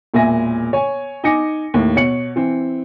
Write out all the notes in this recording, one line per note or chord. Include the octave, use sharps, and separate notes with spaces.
E1 A#2 E5 G#5 A#6
C#5 G#5
D#4 G#5 D6 A#6 C#7
D#2 A2
B2 C#5 C#7 F#7
E3 C4